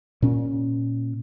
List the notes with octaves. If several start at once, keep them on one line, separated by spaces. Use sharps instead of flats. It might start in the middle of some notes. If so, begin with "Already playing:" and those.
A#2 C#4